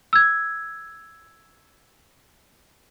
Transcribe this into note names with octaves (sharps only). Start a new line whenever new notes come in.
E6 G#6